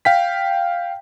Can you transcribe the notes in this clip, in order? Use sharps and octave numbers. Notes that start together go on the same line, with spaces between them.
F5 G5 B6